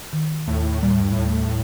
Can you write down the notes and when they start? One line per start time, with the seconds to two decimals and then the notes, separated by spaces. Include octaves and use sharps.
0.13 D#3
0.48 D#2 A2
0.82 A#2 G3
0.92 A2
1.01 G2
1.11 A2
1.18 D#2